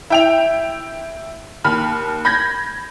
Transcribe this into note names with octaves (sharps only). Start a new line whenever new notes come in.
E4 G5 F7
D#2 B5 F6
B5 G6 G#6 A#6